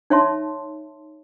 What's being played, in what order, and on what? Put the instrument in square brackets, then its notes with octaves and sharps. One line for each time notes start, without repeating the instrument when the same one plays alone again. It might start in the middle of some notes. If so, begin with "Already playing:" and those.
[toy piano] D#4 C#5 E5 A5 C6